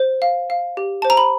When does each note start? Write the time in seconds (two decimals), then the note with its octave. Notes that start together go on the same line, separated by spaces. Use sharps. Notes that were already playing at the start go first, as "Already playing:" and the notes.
Already playing: C5
0.22 F5
0.50 F5
0.77 G4
1.02 C5 A5
1.10 A#5
1.17 B5